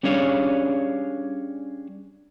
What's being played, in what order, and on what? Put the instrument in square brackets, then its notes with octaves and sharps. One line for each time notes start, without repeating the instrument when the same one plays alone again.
[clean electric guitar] G3 C#4 D4 G#4 C#5 F5